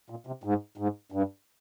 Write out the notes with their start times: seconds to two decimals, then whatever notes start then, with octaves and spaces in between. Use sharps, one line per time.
0.10 A#2
0.27 C3
0.44 G#2
0.78 G#2
1.12 G2